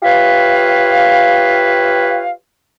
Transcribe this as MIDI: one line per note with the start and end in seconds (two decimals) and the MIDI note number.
0.03 2.30 65
0.03 2.30 67
0.03 2.30 71
0.03 2.30 73
0.03 2.30 76
0.03 2.30 77